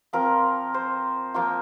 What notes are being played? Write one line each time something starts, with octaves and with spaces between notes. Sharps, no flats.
F3 C4 F4 A#4
C5
F3 A#3 F4